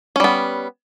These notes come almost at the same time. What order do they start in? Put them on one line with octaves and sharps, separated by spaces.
C#4 G3 B3